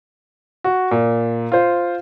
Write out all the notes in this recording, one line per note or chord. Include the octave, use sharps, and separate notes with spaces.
F#4
A#2
F4 C5